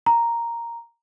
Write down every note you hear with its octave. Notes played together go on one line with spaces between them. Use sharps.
A#5